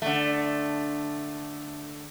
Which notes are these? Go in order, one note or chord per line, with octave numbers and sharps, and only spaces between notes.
D3 A3